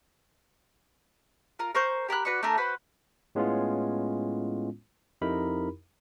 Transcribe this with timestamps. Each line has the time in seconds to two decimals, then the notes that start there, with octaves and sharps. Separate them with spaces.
1.59 F4 A#4
1.75 A#4 C5 C#6 G6
2.08 G4 A#4 B5 F#6
2.25 F#4 B4 D5 C#6
2.43 A3 D4 A#4 A#5
2.57 F#4 B4 C5 B5
3.35 A2 G#3 B3 C#4 E4 F4
5.22 F2 D#4 E4 G4 A#4 B5